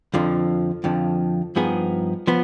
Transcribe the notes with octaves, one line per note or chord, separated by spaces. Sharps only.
F2 D3 F3
F2 D3 F3
G2 F3 B3 D#4 G#4
F3 B3